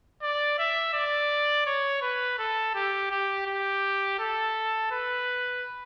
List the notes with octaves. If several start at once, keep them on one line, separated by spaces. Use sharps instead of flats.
D5
E5
D5
C#5
B4
A4
G4
G4
G4
A4
B4